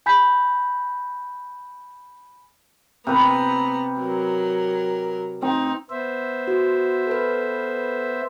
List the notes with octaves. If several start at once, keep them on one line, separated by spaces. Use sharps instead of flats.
G#5 B5 G6 B6
C3 B3 B4 A#5
F#3 A#4
C4 D#4
B3 C5 E5
F#4
A4 B4